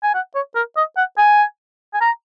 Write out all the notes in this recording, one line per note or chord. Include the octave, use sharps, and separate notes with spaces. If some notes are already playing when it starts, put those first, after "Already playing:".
G#5
F#5
C#5
A#4
D#5
F#5
G#5
G#5
A#5